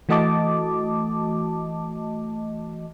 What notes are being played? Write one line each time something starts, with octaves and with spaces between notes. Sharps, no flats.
E3 A3 F#4 D#5 A5 D6